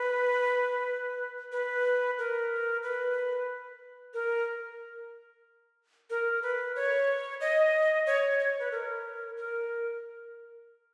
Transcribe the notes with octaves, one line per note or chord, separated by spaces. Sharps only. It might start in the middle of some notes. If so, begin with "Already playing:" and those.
Already playing: B4
B4
A#4
B4
A#4
A#4
B4
C#5
D#5
C#5
C#5
B4
A#4
A#4